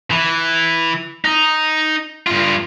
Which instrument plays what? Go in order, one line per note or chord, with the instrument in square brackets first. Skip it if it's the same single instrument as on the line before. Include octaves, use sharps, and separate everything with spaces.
[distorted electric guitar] E3
D#4
G2 F4